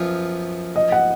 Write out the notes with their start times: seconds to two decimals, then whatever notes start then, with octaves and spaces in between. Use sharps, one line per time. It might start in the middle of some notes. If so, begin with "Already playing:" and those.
Already playing: F#2 F3 B3 F4
0.76 D#5
0.92 F#5